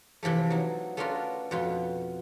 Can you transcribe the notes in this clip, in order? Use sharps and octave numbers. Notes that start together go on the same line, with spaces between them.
C3 E3 F3 A3
F#3 D#4
A3 B3 C#4 D4 F4 A#4
F2 B2 F4